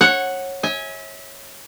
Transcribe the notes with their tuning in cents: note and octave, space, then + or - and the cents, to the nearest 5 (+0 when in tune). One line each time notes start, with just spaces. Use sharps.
C#5 -20 F#5 +0
E5 -35 G#5 +0